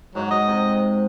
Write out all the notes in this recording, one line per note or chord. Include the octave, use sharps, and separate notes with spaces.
G#2 F#3 F#5
D#5
C3